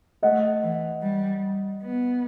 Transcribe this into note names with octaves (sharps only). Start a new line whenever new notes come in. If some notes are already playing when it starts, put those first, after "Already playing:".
A3 D#5 F#5
E3
G3
B3